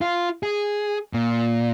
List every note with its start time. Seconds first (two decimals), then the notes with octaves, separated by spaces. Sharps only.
0.01 F4
0.43 G#4
1.13 A#2